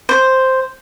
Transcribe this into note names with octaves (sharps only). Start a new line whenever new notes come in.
C5